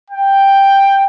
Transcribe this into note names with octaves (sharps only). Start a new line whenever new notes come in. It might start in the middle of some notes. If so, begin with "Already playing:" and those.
G5